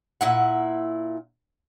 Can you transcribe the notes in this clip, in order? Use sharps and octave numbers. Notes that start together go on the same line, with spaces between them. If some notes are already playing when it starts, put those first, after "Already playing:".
A#2 E4 F#5